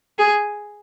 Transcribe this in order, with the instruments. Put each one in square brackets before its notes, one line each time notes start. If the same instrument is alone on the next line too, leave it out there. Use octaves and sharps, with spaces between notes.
[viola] G#4